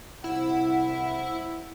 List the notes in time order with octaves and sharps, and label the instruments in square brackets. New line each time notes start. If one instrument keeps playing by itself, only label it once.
[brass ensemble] C2 C5 F#5 [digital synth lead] E4